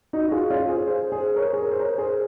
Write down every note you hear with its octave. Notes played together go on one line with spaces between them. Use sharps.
D#4 F#4
F#4
F4 G#4
C#4 F4
G#4 C5
G#4 C5
G#4 C5
A#4 C#5
G#4
A#4
C5
A#4 C#5
G#4 C5